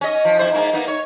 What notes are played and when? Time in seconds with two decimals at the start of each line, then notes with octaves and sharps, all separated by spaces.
0.01 C#4 D#5
0.25 F3
0.39 F2 E4 C5
0.53 G#2 A#3 E4
0.73 A#3 B3 D#4
0.88 C#5